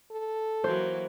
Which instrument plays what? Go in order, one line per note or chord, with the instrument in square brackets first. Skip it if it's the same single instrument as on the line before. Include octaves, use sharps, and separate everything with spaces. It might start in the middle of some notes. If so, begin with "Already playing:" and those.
[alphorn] A4
[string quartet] E3 F#3 A#3 [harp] C5